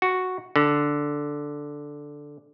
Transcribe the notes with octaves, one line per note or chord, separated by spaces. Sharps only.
F#4
D3